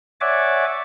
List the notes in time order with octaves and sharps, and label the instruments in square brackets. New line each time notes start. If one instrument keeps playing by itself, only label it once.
[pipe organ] C#5 D5 E5 F#5 G#5 D6